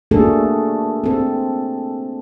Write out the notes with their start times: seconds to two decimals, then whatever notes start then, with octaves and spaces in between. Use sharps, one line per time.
0.11 A3 A#3 D4 F#4 G#4 A4
1.04 C4 A4